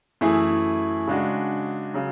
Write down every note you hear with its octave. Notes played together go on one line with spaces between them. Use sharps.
F#2 E3 A3 E4 G#4
C#3 G#3 D4 F#4
C#3 F#3